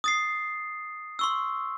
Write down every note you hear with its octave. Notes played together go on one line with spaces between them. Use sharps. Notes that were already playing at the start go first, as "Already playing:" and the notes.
D#6 A6 C7
C6 C#6 E6